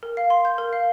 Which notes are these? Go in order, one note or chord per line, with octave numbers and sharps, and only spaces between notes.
A#4
F5
C6
G6
A#4
F5